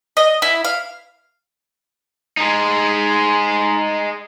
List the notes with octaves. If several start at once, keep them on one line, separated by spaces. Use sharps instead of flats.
D#5
E4
F5
G#3 D#4